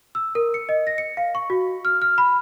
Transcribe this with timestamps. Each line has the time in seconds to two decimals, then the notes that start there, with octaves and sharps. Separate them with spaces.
0.15 E6
0.35 A#4
0.54 C#7
0.69 D#5
0.87 A#6
0.98 C#7
1.17 F5
1.35 C#6
1.50 F#4
1.85 F6
2.02 F6
2.18 B5